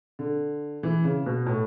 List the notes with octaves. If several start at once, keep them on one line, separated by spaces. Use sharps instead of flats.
D3
E3
C#3
B2
A2